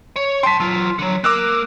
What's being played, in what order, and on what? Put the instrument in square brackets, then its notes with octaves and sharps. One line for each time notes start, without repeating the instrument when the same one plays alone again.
[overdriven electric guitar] C#5
[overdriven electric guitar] G5 A5 [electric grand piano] C6 B6
[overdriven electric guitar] F#3 F4
D3 F#3
[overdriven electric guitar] A#3 A#4 [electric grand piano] D6 E6 F#6